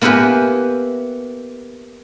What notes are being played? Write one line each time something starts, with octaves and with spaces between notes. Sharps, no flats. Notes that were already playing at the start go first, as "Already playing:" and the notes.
A#3 B3 E4 G4 B4 G#5